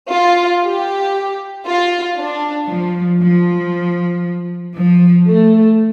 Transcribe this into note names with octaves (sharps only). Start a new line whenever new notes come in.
F4
G4
F4
D4
F3
F3
F3
A3